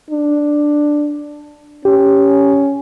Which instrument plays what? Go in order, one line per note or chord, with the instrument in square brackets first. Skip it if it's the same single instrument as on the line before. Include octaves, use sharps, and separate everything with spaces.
[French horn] D4
[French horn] C#4 [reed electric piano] G4